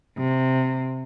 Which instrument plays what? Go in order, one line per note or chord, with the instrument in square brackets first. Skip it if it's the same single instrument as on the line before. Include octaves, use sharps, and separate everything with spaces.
[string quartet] C3